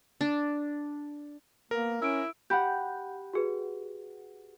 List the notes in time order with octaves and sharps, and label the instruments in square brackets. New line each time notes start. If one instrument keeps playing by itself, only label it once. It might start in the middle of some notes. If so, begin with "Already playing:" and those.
[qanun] D4
[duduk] A#3 [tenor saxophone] B3 [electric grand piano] A#4
[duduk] C#4 [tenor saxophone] E4 [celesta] E6 D7
[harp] G4 F#5 [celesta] B5 G6
[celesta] F#4 G#4 B4